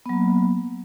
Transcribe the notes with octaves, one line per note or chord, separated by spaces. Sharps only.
F#3 A#3 B3